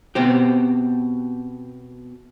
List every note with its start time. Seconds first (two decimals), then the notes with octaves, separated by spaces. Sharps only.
0.15 B2 C4 G4